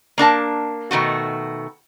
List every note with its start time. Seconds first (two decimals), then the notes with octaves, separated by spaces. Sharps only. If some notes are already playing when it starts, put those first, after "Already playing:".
0.18 A#3 D4 A#4 A5
0.91 B2 D#3 A3 F#4